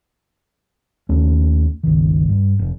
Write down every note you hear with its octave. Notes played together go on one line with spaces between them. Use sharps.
D#2 A3 C#4
G1 C#2 D#3
G2
F1